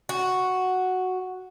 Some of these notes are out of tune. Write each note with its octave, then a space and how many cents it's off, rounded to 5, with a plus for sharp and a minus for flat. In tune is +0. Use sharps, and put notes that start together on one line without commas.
F#4 +0